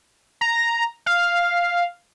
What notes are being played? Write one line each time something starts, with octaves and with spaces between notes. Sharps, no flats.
A#5
F5